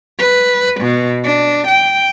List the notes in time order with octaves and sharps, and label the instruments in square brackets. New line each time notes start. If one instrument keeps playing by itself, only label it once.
[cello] B4
B2
D4
G5